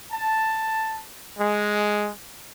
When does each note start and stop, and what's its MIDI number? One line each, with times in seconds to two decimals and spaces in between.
0.12 1.03 81
1.39 2.09 56